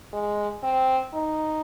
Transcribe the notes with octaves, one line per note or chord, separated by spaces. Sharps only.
G#3
C4
D#4